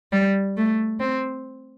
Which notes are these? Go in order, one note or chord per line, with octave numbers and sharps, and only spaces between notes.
G3
A3
C4